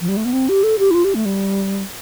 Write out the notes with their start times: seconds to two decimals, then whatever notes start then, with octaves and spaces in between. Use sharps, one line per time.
0.01 F3
0.09 G3
0.17 A3
0.25 B3
0.33 C4
0.49 G4
0.63 A4
0.79 G4
0.91 E4
0.94 F4
1.04 G4
1.15 A3
1.25 G3